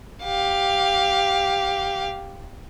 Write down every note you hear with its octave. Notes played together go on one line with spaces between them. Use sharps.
G4 F5